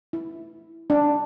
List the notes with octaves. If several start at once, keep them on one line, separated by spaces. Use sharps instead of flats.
E4
D4